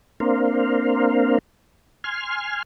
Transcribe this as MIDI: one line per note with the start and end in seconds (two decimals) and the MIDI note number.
0.20 1.38 58
0.20 1.38 60
0.20 1.38 62
0.20 1.38 70
0.20 1.38 72
0.20 1.38 77
2.04 2.62 80
2.04 2.62 84
2.04 2.62 89